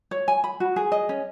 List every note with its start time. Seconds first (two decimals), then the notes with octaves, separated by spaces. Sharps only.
0.11 C#5
0.28 G#5
0.44 B5
0.60 F#4
0.76 G#4
0.92 D#5
1.09 C#4